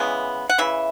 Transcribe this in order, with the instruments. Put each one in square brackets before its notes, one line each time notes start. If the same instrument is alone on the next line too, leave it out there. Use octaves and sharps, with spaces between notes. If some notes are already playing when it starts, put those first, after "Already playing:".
Already playing: [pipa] C#3 E3 G#3 B3
F#5
C#3 E3 E5